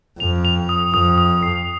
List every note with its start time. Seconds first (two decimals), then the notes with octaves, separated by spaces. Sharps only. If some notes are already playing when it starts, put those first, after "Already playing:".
0.20 F2 F7
0.45 F7
0.69 D#6
0.94 F2 D#6
1.18 D#6
1.43 C7